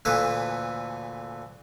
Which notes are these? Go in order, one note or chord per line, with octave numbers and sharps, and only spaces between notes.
D2 A#2 E3 A4 B4 D#5